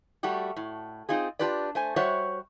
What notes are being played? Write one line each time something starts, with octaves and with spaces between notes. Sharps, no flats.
G3 A3 F#4 G4
A2
C4 D#4 F4 G#4
D4 F4 G4 B4 D5
A3 C5 G#5
G3 F#4 C5 C#5 E5 F#5